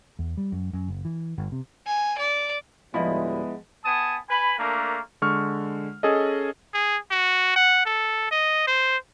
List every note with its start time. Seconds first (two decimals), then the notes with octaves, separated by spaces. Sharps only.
0.19 E2
0.37 G3
0.52 F#2
0.73 F#2
0.88 F#1
1.05 E3
1.38 G1
1.52 C3
1.86 G#5
2.18 D5
2.94 D2 A2 F3 G3 G#3 B3 E4 D#5
3.85 B3 G#5 A5 D#6
4.29 B4 G#5 B5
4.58 A3 A#3 D4 A#4
5.22 D3 G#3 C#6 F6
6.03 C#4 G#4 A4 D#5
6.74 G#4
7.11 F#4
7.56 F#5
7.85 A4
8.31 D#5
8.67 C5